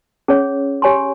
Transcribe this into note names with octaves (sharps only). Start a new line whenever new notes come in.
C#4 G#4 C#5
G4 C#5 G#5 C6